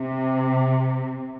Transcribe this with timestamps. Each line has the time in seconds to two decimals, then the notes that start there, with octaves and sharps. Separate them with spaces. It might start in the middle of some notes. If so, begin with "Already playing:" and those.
Already playing: C3